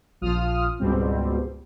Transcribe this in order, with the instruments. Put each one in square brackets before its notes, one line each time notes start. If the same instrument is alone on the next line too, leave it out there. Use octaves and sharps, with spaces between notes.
[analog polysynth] A#1 F3 F4 D#6 F6
C#2 G#2 B2 G3 C4